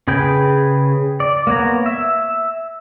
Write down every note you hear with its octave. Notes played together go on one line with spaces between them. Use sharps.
C#3 G#4 B4 G5
D5
A#3 B3 C#5 A#5
E5